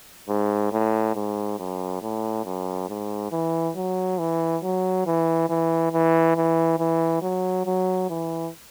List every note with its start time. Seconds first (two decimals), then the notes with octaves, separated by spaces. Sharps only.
0.28 G#2
0.72 A2
1.15 G#2
1.58 F#2
2.02 A2
2.45 F#2
2.89 G#2
3.32 E3
3.76 F#3
4.18 E3
4.63 F#3
5.06 E3
5.49 E3
5.92 E3
6.36 E3
6.78 E3
7.22 F#3
7.66 F#3
8.09 E3